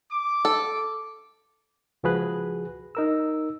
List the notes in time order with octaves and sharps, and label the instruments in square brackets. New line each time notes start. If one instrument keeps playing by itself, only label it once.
[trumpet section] D6
[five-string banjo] A4
[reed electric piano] C#2 F3 F#4 G#4 B4 F#6
D#4 A#4 E6